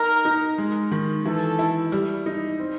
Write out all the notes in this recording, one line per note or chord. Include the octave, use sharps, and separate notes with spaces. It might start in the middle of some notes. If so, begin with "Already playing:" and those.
Already playing: D#4 A#4
D#4
G#3
D#3
E3 A4
E4
G3
D#4
C4